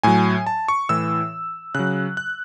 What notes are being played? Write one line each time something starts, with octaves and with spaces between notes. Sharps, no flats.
A2 F#3 G#5
A5
C#6
A2 E3 E6
C#3 F#3 F#6
F#6